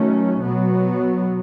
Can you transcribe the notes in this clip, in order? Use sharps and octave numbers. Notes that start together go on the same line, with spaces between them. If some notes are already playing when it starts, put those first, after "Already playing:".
Already playing: D#3 F#3 A3 C#4
B2 F#3 B3